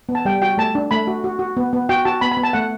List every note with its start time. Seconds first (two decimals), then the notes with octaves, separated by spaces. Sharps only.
0.09 B3
0.15 A5
0.25 G3 G5
0.42 F#4 G5
0.58 A3 A5
0.75 D4
0.91 A3 B5
1.07 F#4
1.24 F#4
1.39 F#4
1.57 B3
1.73 B3
1.89 F#4 G5
2.05 F#4 A5
2.21 B3 B5
2.32 B5
2.37 B3
2.43 A5
2.53 A3 F#5